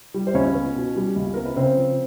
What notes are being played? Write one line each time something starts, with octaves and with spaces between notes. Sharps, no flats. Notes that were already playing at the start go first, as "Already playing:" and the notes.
G3
C5
C#2 C#4 C#5
B3
B2
G3
C#2
B3 A#4
B4
C#3 C4 C5
F3